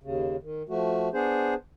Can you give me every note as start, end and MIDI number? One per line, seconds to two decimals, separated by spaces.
0.03 0.37 39
0.03 0.37 49
0.42 0.63 51
0.69 1.09 53
0.69 1.09 57
0.69 1.09 66
1.13 1.54 59
1.13 1.54 62
1.13 1.54 68
1.13 1.54 72